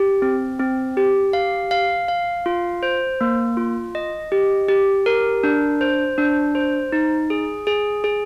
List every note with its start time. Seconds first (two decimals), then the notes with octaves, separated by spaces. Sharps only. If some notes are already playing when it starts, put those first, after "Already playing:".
Already playing: G4
0.22 C4
0.59 C4
0.97 G4
1.33 F5
1.71 F5
2.08 F5
2.46 F4
2.83 C5
3.21 A#3
3.57 F4
3.95 D#5
4.32 G4
4.68 G4
5.06 A#4
5.43 D4
5.81 C5
6.18 D4
6.55 C5
6.92 D#4
7.30 G#4
7.67 G#4
8.04 G#4